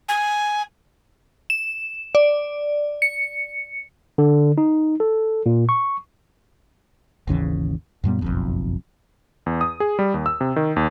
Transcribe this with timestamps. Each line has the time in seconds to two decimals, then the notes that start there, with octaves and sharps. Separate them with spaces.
0.08 G#5
1.50 E7
2.15 D5
3.02 C#7
4.18 D3
4.58 D#4
5.00 A4
5.46 A#2
5.69 C#6
7.27 G#1 D#2 C#3 E3
8.04 F#2 A#2 G3 B3
8.22 F#1 B1 F2
9.46 E2
9.61 D#6
9.80 G#4
9.99 G3
10.14 D#2
10.26 E6
10.41 C3
10.56 D#3
10.76 D#2